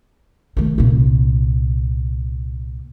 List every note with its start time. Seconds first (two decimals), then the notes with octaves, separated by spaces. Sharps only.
0.57 D#3 A3
0.78 C2 A#2